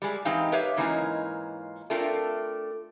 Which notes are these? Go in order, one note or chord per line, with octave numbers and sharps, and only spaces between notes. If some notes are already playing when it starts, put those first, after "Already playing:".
G3 G#3
G#2 E3 C4 D#4 G4 F5
G4 B4 C#5 E5 F5
G#2 E3 A#3 C#4 D#4 F4
A3 C4 D4 F4 A#4